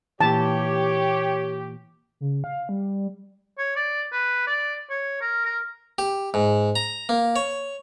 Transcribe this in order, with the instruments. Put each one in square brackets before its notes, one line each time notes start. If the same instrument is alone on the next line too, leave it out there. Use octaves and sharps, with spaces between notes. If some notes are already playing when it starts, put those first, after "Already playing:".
[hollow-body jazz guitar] A#2 E3 [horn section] G4 [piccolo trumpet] C#5 [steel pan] A5
[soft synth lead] C#3
F5
G3
[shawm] C#5
D5
B4
D5
C#5
A#4
A#4
[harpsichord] G4
G#2
A#5
A#3
C#5